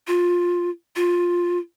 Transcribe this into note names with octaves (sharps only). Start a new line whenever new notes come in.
F4
F4